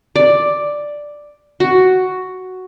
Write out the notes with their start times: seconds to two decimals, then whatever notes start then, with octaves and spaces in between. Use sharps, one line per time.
0.16 D5
1.60 F#4